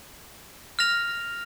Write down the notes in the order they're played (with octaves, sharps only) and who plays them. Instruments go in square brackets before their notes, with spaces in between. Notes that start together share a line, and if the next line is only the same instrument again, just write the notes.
[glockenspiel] F6 A#6 F7